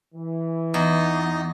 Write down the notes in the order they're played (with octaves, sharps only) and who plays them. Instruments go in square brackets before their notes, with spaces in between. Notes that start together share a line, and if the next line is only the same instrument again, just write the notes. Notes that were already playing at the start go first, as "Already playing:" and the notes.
[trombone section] E3
[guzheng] E2 [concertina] D#4 D#5